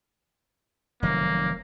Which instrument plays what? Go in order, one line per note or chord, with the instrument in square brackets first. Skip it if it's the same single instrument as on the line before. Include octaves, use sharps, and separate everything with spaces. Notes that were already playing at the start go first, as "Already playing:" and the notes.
[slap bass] F1 D#3 F#3 [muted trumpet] A#3